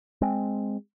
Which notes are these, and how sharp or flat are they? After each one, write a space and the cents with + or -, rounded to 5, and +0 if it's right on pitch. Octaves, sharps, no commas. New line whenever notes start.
G#3 +0 C4 +0